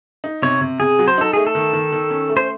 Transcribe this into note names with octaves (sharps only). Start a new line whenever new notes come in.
D#4
C3 C#5
C3
C3 G#4
F#3
C5
D#4 A4
A3 G#4
A4
D#3
D#3
D#3
C#4
A3
C5